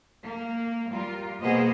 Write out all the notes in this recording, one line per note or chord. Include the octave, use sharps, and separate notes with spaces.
A#3
G3 F4 A#4
B2 A#3 B3 G#4 C5 D#5